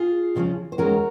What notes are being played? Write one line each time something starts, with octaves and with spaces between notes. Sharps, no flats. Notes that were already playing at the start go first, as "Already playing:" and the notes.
Already playing: F4 G#4
D#2 C#3 F3 A#3 C#4
C5
D#2 D#3 G#3 C#4 F#4 A#4